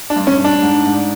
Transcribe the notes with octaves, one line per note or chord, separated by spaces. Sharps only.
D4
G2
C#4
G2
D4
G#2
G#2